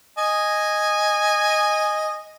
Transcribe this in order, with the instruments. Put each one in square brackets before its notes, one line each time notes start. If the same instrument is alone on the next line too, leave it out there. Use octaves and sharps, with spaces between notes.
[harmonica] D#5 G#5